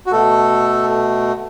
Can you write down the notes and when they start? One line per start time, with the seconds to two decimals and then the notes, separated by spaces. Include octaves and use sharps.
0.06 F#4
0.12 B2 A3 A4